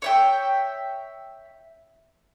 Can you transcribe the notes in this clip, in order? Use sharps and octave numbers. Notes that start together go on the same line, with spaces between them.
C#5 E5 G5